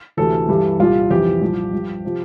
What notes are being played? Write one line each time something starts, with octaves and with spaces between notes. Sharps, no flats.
D2 C3 E3 A4
G2 E3 G3
C2 A#2 G3 F4
F2 C3 E3 G3 G4
C2 A#2 F3
G2 F3
C3 F3